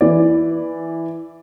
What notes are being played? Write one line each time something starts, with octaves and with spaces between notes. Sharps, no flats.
E3 D5